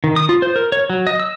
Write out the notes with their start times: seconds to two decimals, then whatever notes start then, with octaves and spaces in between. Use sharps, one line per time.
0.04 D#3
0.16 D#6
0.29 F4
0.42 C5
0.56 A#4
0.72 C#5
0.90 F#3
1.07 D#5
1.20 E6